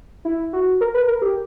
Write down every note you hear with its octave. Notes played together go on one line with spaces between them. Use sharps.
E4
F#4
A#4
B4
A#4
G4